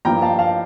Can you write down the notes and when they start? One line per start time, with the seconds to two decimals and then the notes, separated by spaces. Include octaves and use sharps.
0.05 G2 F3 A#3 G5 A#5
0.22 F5 A5
0.39 F5 A5